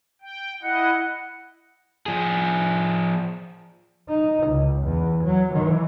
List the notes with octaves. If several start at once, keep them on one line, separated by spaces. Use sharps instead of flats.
G5
E4 D#5 F#5
F3 G#4
D#4
C#2
E2
F#3
E3